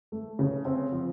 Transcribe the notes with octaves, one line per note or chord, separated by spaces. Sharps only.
A3
C#3
C4
F3